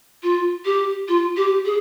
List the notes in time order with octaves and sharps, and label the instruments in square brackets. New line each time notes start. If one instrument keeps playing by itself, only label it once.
[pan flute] F4
G4
F4
G4
G#4